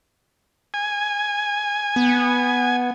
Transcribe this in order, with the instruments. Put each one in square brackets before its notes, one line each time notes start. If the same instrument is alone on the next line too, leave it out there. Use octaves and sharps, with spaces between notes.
[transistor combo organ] G#5
[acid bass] B3